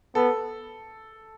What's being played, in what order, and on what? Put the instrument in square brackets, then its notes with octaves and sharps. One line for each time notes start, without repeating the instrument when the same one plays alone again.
[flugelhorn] B3 [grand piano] A4